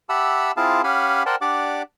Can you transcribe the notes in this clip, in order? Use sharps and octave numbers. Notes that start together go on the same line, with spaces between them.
G4 E5 F#5 A5 B5 E6
C4 E4 F4 G#4 F5 A5
C#4 G4 F5 F#5 G#5 B5
A#4 C5 D5 F#5 G5 A5
D4 G4 D5 F#5 D6